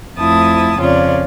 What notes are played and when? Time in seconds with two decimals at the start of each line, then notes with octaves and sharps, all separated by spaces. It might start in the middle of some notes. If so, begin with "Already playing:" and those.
0.18 F2 A3 E4 A5 D#6
0.79 F2 C#3 F4 C#5 D5